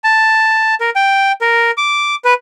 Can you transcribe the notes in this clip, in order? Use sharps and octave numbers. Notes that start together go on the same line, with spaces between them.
A5
A#4
G5
A#4
D6
B4